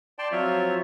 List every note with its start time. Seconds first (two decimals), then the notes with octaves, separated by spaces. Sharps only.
0.19 D5 G5 A5 C6
0.32 F3 F#3 C4 F4 C#5 E5